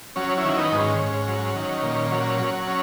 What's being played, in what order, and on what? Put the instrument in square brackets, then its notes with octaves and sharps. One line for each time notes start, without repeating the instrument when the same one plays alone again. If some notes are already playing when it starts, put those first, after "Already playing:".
[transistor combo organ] F#3 C#4
C#4 E4
D#3
B3 D#4
G#2
C#4
G#2 C#4
F#3
D#3
A#2
F#3
F#3
C#4